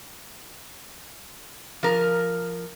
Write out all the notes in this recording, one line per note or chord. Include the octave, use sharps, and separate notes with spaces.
F3 A#4